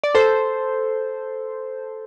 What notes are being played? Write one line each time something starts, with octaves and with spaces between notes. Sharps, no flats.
D5
A4 C5